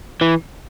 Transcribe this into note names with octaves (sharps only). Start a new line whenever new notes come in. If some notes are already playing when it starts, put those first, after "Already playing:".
E3